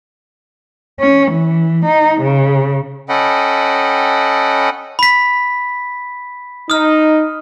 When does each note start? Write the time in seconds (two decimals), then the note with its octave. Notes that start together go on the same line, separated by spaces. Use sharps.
1.00 C#4
1.31 E3
1.85 D#4
2.21 C#3
3.09 C#4 A4 D#5 F#5 G5 B5
4.99 B5 B6
6.70 D#4 D#6 F6